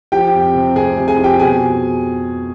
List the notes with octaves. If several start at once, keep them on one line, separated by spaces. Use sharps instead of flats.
F3 G4 G5
F2
C3
F1 G#4 G#5
C3
G#4 G#5
F3
G4 G5
B2 G#4 G#5